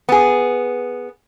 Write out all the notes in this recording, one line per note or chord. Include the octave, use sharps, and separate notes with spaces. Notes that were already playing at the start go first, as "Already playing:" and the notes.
B3 G#4